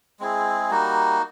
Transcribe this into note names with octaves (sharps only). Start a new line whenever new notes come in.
G#3 C4 E4 G#4
G3 A#3 D#4 F#4